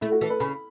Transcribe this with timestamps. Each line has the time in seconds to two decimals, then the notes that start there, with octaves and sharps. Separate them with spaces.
0.01 A3 E4
0.12 F#4
0.21 E3 A4
0.30 B4
0.40 C#3 B5